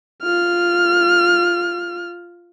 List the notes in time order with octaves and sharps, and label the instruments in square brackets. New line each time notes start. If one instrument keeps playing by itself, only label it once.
[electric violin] F4 F6